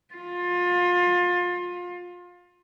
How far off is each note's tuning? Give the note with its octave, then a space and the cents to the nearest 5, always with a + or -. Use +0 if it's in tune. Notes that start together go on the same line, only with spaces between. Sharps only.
F4 +25